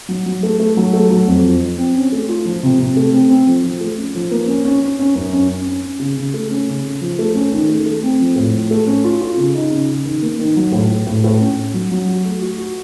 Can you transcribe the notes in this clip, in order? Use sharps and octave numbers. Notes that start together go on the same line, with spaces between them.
F#3
F#3
A3
A3
F#3
A3
F#3
F2
F3
F3
C4
C#4
A3
F4
F3
C3
C3
A3
C4
C4
F3
F3
A3
C#4
F3
A#3
C#4
C#4
C#4
C#4
F#2
C#4
C#4
C#4
C#4
C#3
C#3
A3
C#4
C#3
C#3
F3
A3
C#4
D#3
A3
A3
C4
F3
A2
F3
A3
C#4
F4
F4
C#3
D#4
C#3
C#3
D#3
A#3
D#3
F#3
A2
A2
A2
A2
C#4
C#4
F#3
F#3
F#4
A3
F#4
F#4